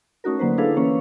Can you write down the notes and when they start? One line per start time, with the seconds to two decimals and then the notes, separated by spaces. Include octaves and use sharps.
0.24 A3 C#4 D#4 F#4 A#4
0.39 D3 F#3 A#3 B4 C5
0.58 D4 E4 G#4 A4 B4 F5
0.77 E3 A#3 C#4 C#5